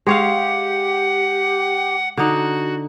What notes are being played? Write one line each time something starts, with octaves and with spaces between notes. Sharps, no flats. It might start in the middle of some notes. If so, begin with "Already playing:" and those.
G#3 G4 C#5 F5 F#5
D3 D#4 F#4